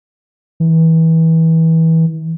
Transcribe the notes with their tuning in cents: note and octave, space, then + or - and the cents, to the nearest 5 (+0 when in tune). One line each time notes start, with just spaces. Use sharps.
E3 -25